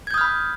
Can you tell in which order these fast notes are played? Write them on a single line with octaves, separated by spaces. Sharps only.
G#6 G6 D#6 F6 B5